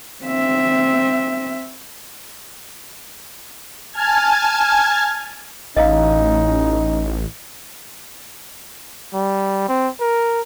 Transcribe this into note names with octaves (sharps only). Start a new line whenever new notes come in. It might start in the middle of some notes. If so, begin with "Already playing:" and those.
C4 E5
G#5 A5 F6 G#6
A1 C#4 D#4 D#5 F5 A#5
G3
C4
A#4